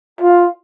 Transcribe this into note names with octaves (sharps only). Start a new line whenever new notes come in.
F4